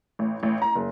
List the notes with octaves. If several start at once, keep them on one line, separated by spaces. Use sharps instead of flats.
A1
A1
A#5
F#1